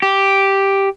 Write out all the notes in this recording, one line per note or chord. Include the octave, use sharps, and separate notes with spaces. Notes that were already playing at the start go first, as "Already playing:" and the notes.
G4